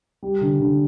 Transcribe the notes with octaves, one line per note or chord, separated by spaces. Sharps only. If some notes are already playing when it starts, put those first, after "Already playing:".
G3
D3
D3